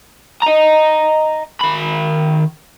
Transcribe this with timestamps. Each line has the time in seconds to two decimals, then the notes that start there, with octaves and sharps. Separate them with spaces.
0.42 D#5 A#5
1.61 D#3 B5